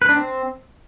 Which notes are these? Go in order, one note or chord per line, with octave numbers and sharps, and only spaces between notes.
B4
D4
C4